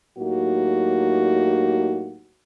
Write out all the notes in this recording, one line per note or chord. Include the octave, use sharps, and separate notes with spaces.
A2 F#3 A#3 D#4 F#4 G4